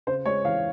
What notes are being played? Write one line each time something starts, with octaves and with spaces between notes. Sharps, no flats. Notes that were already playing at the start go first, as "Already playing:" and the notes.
C#3 C5
G#3 C#5
E3 F5